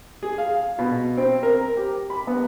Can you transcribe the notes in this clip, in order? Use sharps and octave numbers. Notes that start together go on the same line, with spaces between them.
G#4
F5
B2
C4
A#4
G4
B5
B3